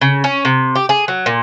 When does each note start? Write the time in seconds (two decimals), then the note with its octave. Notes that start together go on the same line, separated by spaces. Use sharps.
0.01 C#3
0.24 C#4
0.45 C3
0.75 G4
0.89 G#4
1.08 F#3
1.26 A#2